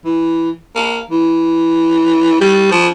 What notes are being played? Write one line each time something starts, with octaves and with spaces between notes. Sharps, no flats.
E3
A#3
E3
G3
F3